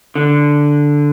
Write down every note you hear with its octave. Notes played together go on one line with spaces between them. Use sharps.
D3